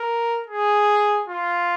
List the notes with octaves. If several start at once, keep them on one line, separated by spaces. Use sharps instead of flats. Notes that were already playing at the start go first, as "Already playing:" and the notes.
Already playing: A#4
G#4
F4